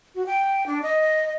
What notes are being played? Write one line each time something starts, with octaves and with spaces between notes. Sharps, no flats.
F#4
G5
D4
D#5